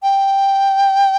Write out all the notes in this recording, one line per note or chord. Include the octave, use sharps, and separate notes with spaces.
G5